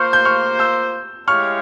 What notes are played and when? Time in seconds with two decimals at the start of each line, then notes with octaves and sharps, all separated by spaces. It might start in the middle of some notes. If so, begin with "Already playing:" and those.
Already playing: A#3 F4 C5 C#6 F6
0.13 G6
0.25 C#6 F6
0.59 E6 G6
1.28 G#3 E4 G4 C#5 F5 C#6 F6